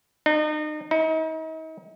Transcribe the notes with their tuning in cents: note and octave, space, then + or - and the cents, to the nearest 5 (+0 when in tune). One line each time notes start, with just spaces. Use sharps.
D#4 -35
D#4 +40